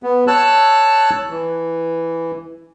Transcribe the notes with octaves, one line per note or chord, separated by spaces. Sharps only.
B3
C#5 A5 E6 F#6
E3